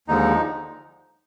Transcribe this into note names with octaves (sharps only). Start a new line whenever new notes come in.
D#2 D3 F3 G#3 D#4